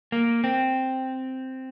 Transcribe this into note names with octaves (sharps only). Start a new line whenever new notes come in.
A#3
C4